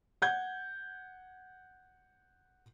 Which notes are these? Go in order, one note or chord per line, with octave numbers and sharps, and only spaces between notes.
F#5 G6 G#6